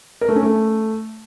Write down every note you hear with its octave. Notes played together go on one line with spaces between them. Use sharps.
A#4
A3
C#4
A3